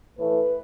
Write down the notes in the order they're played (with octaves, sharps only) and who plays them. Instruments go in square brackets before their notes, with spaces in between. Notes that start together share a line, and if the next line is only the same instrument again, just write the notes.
[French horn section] A2 E3 A3 B4